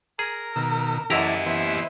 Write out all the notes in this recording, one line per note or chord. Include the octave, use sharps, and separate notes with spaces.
G#4 A#4
B2 D#3 E6
F#2 E3 E4 G4 A4 D5 D#5 A#5
E3 B3 C5 E5